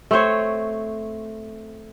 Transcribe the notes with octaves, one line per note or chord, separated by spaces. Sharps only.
A3 C4 C5 C#5